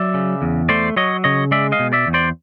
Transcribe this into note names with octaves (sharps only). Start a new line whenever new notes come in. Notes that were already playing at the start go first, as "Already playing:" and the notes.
Already playing: F#3 D5 E5
C#3
E2
A3 C5 D5
F#3 C#5 D#5
C#3 C#5 D#5
G#3 D5 E5
D#5 F5
B2
D5 E5
E2
C5 D5